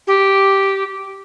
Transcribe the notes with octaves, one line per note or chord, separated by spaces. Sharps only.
G4